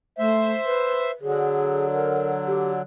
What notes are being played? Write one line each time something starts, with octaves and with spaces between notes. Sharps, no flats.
A3 C5 E5
B4
D3 F#3 G#4
A#4
G4